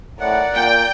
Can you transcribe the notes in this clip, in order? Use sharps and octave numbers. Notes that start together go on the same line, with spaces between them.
A2 A#4 D5 F#5
A#2 G5